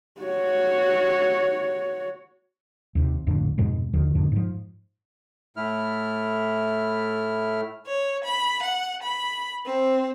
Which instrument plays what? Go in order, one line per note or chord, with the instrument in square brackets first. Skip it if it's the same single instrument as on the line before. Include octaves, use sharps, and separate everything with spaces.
[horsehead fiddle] F#4 C#5
[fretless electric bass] D#2 C3
A#1 F2 A2 D3
F2 G#2 B2 G#3
D#2 D3 D#3 F3
F2 G#2 B2 D3
G#2 F3
[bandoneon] A2 A3 E4 F6
[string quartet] C#5
B5
F#5
B5
C4